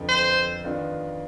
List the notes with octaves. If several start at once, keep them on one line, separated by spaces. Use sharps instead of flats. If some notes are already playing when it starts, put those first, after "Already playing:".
Already playing: F2 D3 F3 B3
C5
D#3 B3 D4 F4